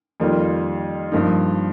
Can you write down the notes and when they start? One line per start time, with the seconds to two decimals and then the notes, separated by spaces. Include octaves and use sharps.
0.20 F2 D#3 G3 A#3 F4
1.12 G2 F3 A#3 D#4